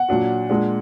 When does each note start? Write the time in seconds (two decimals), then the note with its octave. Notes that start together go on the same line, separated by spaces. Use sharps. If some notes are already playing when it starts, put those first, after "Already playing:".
Already playing: F#5
0.09 A#2 F#3 D4 F#4
0.50 A#2 G#3 D4